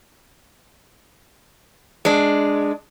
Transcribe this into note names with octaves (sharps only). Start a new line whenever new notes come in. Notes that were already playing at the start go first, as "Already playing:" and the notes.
G#3 D4